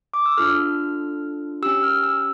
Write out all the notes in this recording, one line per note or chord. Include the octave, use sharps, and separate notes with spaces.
D6
E6
D4 F4 A4 F6
C#4 G4 E6
F6
E6